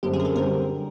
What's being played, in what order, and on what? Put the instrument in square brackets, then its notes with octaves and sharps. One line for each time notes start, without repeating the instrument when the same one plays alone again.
[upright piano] F#2 D3 G3 C4 [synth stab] G4
[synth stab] G#4
A#4
A4
[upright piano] D3 G3 C4 [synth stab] A#4